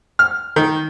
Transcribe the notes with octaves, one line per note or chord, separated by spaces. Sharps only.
F6
D#3